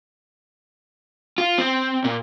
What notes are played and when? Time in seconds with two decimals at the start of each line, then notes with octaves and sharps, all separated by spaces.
1.38 F4
1.58 C4
2.04 A#2